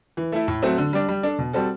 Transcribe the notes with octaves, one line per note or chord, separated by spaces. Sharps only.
E3
A3 E4
A2
F#3 A3 C4 F#4
D3
G3 D4
G3
D4 A4
B2
G3 C4 F#4 A4